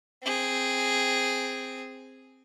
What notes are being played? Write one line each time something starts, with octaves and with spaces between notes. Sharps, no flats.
C4 G#4